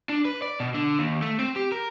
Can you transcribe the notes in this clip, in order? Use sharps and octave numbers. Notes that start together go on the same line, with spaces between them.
D4
B4
D5
B2
D3
D#2
A3
C4
G4
A#4